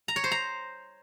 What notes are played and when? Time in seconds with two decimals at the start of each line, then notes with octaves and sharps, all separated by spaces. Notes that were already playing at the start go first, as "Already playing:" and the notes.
0.08 A#5
0.16 C#5
0.24 C5
0.31 A#5